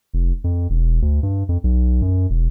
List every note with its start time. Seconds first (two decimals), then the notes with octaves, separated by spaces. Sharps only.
0.14 F1
0.44 F2
0.70 E1
1.02 D2
1.23 G2
1.49 F2
1.64 B1
2.02 F#2
2.30 E1